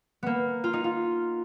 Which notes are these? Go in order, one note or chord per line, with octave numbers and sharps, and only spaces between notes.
A#3 B3
F4
D#4
F4